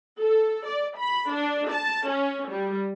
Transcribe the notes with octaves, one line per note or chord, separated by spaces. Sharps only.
A4
D5
B5
D4
A5
C#4
G3